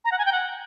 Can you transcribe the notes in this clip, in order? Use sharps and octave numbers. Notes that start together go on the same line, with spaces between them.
A#5
F#5
G#5
G5
F#5